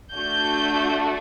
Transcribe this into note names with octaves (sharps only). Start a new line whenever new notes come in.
A3 D4 F#4 G6